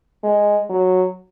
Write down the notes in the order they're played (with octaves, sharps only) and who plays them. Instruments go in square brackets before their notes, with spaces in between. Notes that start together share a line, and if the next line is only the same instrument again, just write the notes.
[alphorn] G#3
F#3